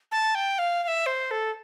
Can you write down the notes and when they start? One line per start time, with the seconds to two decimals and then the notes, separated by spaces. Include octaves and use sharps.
0.12 A5
0.35 G5
0.59 F5
0.83 F5
0.88 E5
1.06 C5
1.31 A4